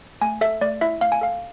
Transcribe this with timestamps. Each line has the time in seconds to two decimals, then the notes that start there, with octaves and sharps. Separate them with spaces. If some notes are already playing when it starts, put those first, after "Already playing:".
0.21 A3 G#5
0.41 A4 E5
0.61 A3 D5
0.81 E4 E5
1.01 A3 F5
1.12 G#5
1.21 A4 F5